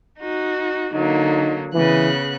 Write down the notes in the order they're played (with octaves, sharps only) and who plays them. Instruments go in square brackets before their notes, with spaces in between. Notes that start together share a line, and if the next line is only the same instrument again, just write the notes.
[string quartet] D#4 F#4
[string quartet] D3 F#3 A#3 [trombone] D#4
[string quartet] C#3 B3 F#6 [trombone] E3